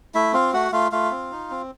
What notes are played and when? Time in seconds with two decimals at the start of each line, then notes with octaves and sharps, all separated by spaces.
0.15 A3 E4 E5
0.33 C4 F4 F5
0.53 A3 F#4 F#5
0.72 A3 F4 F5
0.92 A3 F4 F5
1.11 C4
1.32 D#4
1.50 C4